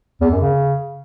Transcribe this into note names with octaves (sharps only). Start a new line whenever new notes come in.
E2
F#2
C#3